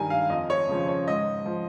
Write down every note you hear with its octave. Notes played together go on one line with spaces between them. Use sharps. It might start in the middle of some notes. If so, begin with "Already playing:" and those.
Already playing: G2 D#3 G3 G#5 A#5
F5
F2 D#5
C#5
C#3 F3
C#5
G#2 D#5
F3